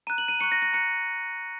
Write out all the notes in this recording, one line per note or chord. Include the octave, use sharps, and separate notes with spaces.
A#5 F#6 D#7
F#7
D#7
A#5 C#6 F#6 C#7
A#6
A#6
A#5 F#6 C#7